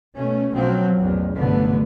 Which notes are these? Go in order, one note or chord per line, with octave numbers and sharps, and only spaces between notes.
B2 A3 C#4
B1 B2 F3 F#3 C4
A1 E2
F1 B1 G2 D3 A3 B3